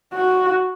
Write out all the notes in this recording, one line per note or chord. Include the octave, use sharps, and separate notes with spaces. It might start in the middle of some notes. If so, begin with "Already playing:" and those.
F#4